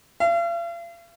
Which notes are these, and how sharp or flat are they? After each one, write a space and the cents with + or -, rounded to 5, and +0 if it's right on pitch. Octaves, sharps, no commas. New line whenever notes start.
F5 -45